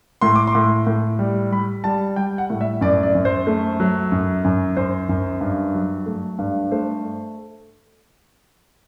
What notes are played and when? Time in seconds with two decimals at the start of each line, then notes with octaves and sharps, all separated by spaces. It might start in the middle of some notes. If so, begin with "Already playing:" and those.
0.21 A2 C6
0.35 D6
0.47 C6
0.55 A2
0.87 A2
1.19 G3
1.52 G3 B5
1.84 G3 A5
2.16 G3 G5
2.38 F#5
2.50 A2
2.61 E5
2.81 F#2 D5
3.03 D5
3.15 F#2
3.25 C5
3.47 A3
3.80 F#3
4.12 F#2
4.45 F#2
4.77 F#2 C5
5.09 F#2
5.41 G2
5.74 F#3
6.06 A3
6.39 G2
6.71 A3 C5